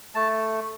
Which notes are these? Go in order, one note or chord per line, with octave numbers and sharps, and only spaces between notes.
A3 A5